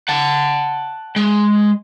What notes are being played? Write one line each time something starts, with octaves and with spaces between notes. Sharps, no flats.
F#5 A5
G#3